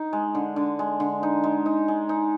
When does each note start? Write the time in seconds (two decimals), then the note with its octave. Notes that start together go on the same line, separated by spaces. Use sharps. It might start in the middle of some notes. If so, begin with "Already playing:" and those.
Already playing: D#4
0.13 G#3
0.35 D3
0.56 D3
0.79 G#3
1.00 D3
1.23 D#4
1.44 G#3
1.66 D#4
1.88 G#3
2.09 D#4